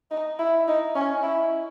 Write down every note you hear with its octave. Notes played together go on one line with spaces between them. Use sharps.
D#4
E4
D#4
C#4
E4